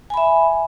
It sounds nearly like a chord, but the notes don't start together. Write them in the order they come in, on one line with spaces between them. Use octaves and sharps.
G#5 B5 E5